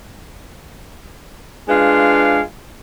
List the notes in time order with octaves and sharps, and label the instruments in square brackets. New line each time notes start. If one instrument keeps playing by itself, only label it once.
[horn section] G#3 D4 F4 B4 F5